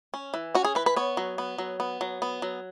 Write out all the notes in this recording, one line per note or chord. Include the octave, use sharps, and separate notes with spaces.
C#4
E3
C#4 F#4
G#4
E3 B4
B4
B3 C#5
F#3
B3
F#3
B3
F#3
B3
F#3